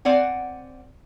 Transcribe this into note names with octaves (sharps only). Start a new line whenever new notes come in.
C4 D5 F#5 G#5